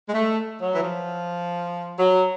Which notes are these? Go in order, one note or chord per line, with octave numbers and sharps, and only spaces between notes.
G#3
A3
F#3
E3
F3
F#3